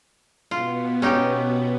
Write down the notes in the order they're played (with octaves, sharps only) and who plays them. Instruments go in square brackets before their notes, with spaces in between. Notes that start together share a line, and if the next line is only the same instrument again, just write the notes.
[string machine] B2 B3 [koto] F4
[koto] C#4 D#4 G4